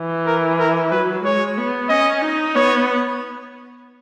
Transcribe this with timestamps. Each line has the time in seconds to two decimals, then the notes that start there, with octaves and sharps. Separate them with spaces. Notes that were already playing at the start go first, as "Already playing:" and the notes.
Already playing: E3
0.26 A#4
0.59 A#4
0.91 F#3 B4
1.24 G#3 C#5
1.58 B3
1.89 C#4 D#5
2.22 D#4
2.55 B3 C#5